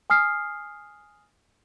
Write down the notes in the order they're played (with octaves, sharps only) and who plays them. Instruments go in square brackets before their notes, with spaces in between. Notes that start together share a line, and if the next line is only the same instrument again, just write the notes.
[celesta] G#5 D#6 F6 C7